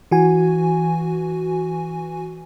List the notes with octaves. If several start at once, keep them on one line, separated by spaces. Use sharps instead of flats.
E3 F#4 G#5